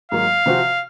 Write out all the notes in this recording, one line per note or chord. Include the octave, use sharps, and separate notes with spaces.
G#2 F#3 A#3 F5
C3 F3 C4 F#4